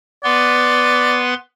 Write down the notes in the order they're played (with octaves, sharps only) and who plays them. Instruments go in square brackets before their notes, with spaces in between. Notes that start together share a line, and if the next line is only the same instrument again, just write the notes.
[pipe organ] B3 B4 C6 [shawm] D5